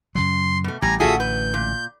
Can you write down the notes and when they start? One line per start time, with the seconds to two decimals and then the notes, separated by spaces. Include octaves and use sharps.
0.15 F#2 C#3 F#3 C6
0.64 B2 A3
0.82 A1 G3 G#5 A#5
1.00 A1 D3 F4 F#4 G#4 A4 E5 D#6
1.20 B4 G6
1.54 A#2